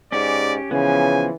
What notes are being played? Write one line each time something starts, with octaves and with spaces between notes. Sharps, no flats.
G#2 C#4 G4 D5
C#3 E3 F3 B3 G#5